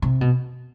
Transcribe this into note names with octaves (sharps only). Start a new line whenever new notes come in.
C3
B2